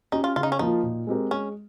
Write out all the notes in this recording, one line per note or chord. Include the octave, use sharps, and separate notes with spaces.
C#4 D#4 G4
F4
C#3 F4
D#4
C#4
F3 A#3 D#4 F4
A#2
G#3 C4 G4 A#4
G#3 C#4